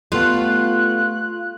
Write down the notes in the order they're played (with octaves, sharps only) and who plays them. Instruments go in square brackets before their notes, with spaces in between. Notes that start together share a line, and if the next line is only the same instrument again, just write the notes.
[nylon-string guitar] G3 A3 B3 [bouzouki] F4 [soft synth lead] F#6